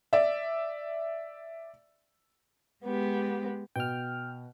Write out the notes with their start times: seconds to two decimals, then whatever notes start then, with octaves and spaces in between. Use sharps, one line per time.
0.13 D5 E5
2.84 G#3 B3 G4
3.76 B2 G5 F6